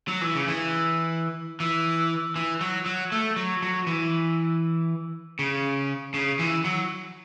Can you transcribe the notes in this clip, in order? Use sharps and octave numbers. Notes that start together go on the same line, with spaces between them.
F#3
E3
C#3
E3
E3
E3
F#3
F#3
A3
F#3
F#3
E3
C#3
C#3
E3
F#3